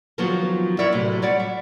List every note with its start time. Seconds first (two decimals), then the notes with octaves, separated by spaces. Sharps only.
0.18 D#3 F3 F#3 B3 F4 F#4
0.79 E4 A#4 C#5 D5 E5
0.92 A2 C3 F#3
1.22 G3 C#5 D5 F#5
1.40 E5